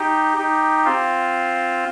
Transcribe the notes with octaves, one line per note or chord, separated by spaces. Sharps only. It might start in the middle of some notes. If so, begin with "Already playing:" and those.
Already playing: D#4 G4
D#4 G4
C4 F4